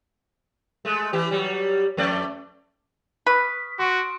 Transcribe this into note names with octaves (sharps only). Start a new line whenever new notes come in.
G#3 A3
E3 G4
F#3 G3
F2 A3 D5
B4 C#6 D#6 F6
F#4 C6 C#6 D7